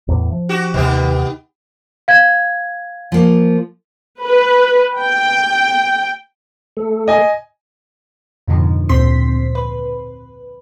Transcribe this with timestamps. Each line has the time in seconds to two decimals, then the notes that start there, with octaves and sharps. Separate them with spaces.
0.08 E2 A2
0.31 F3
0.49 F#4 G4
0.74 D#2 C3 D#3 B3 G4
2.08 F5 G#6
3.12 F3 A#3
4.22 B4
4.99 G5
6.77 A3 A4
7.08 D#5 G#5
8.48 F2 G#2 B2 D3 D#3 F3
8.89 D2 A#2 C4 C6 B6
9.55 B4